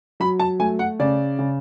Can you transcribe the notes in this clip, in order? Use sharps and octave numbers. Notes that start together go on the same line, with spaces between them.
F#3 B5
A5
A3 G#5
F#5
C#3 D5
C#3